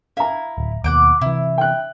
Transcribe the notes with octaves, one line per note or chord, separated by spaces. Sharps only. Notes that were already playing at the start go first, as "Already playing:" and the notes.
E4 F5 A#5
D1
D#2 B2 F#5 G5 D6
C3 E3 E4
G5 F#6